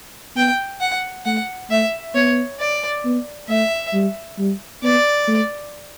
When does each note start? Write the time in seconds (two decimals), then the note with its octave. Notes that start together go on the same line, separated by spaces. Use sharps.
0.36 B3 G5
0.81 F#5
1.25 A3 F#5
1.70 A3 E5
2.15 B3 C#5
2.59 D5
3.05 B3
3.49 A3 E5
3.93 G3
4.39 G3
4.83 B3 D5
5.27 A3